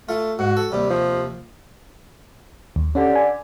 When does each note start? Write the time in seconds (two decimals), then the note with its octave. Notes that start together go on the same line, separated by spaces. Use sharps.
0.09 A3 F4
0.39 G#2 F#4
0.57 A4
0.72 D#2 C3 G3
0.90 F3
2.76 D#2
2.95 D3 C#4 G4
3.16 G#5